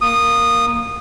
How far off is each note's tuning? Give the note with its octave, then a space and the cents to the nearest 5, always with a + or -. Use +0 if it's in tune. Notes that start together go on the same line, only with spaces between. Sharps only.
A#3 +0 D#6 -15